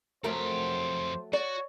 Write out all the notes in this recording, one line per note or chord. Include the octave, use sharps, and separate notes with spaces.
F2 F#3 A3 G4 A#4 C5
F#4 C#5 D5